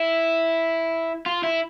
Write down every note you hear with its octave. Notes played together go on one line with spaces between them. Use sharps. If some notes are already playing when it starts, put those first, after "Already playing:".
Already playing: E4
F4
E4